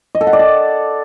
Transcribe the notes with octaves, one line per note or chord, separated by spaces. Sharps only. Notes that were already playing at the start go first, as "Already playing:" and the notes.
D#5
A4
F#5
D5
A5